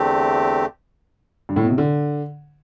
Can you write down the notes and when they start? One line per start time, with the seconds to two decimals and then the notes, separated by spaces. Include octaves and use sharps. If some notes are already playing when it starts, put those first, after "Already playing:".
Already playing: E2 D3 A3 C4 G4
1.49 G2
1.56 A2
1.63 B2
1.70 C3
1.78 D3